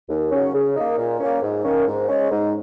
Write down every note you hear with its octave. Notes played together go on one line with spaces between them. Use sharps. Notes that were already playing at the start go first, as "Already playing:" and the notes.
D#2
C#3 F#3 C#4
C#3
A#3 D#4
A#2
A#3 C#4
G#2
D#3 A#3 C#4
G#2
G#3 C#4
G#2